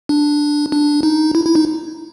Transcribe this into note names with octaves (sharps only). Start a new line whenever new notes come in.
D4
D4
D#4
E4
E4
D#4